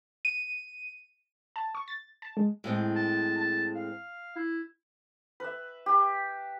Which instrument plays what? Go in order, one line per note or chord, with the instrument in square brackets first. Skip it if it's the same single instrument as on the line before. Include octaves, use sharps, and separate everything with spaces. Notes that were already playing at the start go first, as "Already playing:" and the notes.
[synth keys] D#7
[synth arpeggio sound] A5
C#6
A6
A5
G#3
[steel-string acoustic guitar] A2 G#3 C4
[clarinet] A5
A5
F5
E4
[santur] B4 E5
G4